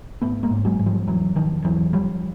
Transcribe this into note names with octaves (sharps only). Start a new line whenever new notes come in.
G#1 A3 B3
G#3 A#3
G#2
F#3 G#3
G#2
F3 G3
E1 E3 F#3
E1 D#3 F3
E2 E3 F#3
D2 F3 G3